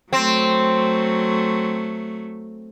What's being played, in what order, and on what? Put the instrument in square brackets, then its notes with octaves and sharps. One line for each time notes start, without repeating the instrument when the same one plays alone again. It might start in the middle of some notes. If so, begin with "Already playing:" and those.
[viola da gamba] F#3 A3 [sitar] C4